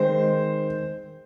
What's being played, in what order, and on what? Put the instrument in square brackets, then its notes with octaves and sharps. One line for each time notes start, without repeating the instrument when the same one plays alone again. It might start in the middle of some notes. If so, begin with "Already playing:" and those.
Already playing: [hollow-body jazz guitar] D#3 G#3 C4 [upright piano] C5